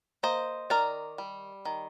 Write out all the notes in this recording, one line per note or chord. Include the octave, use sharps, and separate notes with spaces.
A#3 C5 D#5
D#3 A#4 D5
G3
D#3